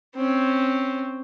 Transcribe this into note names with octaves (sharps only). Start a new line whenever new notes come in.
C4 C#4